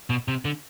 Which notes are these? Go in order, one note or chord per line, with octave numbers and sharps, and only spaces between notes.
B2
C3
D3